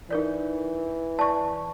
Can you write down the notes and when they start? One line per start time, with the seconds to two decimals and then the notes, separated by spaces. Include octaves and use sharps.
0.11 E3 D#4 A#4 D5
1.19 D5 A5 C#6